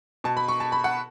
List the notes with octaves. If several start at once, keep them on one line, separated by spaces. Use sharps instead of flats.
B2 A5
B5
C#6
A5
B5
F#5